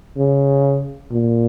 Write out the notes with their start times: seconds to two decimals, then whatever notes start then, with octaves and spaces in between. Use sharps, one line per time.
0.17 C#3
1.12 A#2